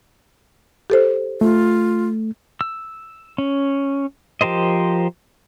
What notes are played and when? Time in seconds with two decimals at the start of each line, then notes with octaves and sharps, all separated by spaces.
0.90 G4 A4 C5
1.41 A3 F4
2.61 E6
3.38 C#4
4.41 F3 G4 A#4 C5 D#5